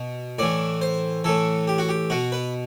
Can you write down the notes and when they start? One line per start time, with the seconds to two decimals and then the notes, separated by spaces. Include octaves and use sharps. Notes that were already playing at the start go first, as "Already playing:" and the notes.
Already playing: B2
0.39 A2 E3 D5
0.82 C5
1.24 A2 E3 A4
1.67 G4
1.78 F#4
1.89 G4
2.10 B2 F#4
2.32 B4